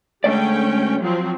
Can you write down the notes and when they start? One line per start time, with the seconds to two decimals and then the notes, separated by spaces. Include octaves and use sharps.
0.24 D2 G#3 A3 C#4 D5 G5
1.00 F3 F#3 C4